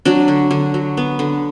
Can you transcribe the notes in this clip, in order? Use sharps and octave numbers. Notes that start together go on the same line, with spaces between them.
F#3 D4
D3
D3
F#3
B3
D3